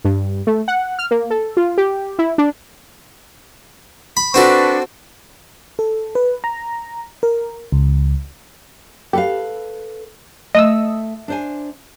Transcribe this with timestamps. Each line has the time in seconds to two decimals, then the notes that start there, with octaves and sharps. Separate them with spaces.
0.05 G2
0.47 A3
0.68 F#5
0.99 F6
1.11 A#3
1.30 A4
1.57 F4
1.78 G4
2.19 E4
2.38 D4
4.17 B5
4.34 C4 D4 F#4 A4 B4 C#6
5.79 A4
6.15 B4
6.44 A#5
7.23 A#4
7.72 C#2
9.13 G4 A4 B4 F5
10.55 A3 D#5 D#6 E6
11.28 D4 C5 G#5